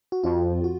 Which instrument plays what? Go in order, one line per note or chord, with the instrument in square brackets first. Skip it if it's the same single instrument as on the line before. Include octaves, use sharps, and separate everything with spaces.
[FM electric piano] F#4
[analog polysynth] F2 [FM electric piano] F4
[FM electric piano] F#4